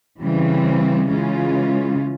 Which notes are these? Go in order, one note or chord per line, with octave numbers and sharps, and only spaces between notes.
C#3 E3 G3 C4
C#3 E3 G#3 C#4 F4